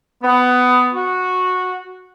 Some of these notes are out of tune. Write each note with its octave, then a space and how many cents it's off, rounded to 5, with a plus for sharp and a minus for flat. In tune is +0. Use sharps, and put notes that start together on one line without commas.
B3 +15
F#4 -10